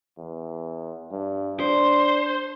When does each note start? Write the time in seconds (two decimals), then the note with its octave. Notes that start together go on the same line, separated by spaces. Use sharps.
0.18 E2
1.11 G2
1.60 D4 C5